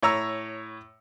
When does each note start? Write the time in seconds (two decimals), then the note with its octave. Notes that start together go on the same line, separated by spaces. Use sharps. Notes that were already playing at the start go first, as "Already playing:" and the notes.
0.03 A2 C#5 A#5 E6